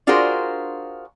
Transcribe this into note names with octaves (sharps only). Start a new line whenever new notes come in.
D4 F4 F#4 G#4 A#4 C5